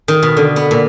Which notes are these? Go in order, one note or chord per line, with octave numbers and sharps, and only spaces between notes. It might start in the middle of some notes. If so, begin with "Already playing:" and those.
D#3
B2
D3
B3
A#2